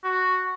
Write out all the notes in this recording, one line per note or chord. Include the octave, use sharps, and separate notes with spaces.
F#4